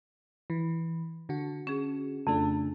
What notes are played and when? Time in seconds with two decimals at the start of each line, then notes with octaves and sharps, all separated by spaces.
0.50 E3
1.29 D3 F#4
1.67 C#4 G#4
2.27 F2 C#3 A3 D4